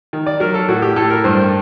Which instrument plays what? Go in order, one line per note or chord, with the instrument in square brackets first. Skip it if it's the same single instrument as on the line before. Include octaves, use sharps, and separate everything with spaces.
[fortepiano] D#3
D5
F#3 A#4
A4
A2 F#4
G4
A2 A4
A#4
G2 C5